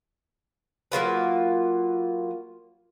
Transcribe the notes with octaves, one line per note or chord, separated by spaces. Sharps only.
F#3 A#3 F4 B4